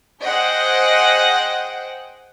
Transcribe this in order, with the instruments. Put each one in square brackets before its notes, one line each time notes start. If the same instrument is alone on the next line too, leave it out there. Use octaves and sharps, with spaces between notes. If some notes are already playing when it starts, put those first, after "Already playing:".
[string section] G#4 C5 D#5 F#5 G5